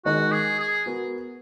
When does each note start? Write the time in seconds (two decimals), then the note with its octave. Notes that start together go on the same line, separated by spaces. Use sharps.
0.05 D#3 G#3 D#4 F#4 A#4 D#5
0.32 G#4
0.59 G#4
0.86 B3 F#4 A#4